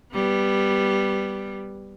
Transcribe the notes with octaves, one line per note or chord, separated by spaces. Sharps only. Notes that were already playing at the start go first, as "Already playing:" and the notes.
G3 B3